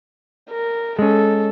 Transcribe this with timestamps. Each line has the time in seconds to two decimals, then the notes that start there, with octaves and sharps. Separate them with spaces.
0.50 A#4
0.99 G#3 C#4 A4